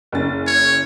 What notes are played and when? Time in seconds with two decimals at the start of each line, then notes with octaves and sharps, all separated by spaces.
0.12 F#1 C#4 A6
0.47 C#5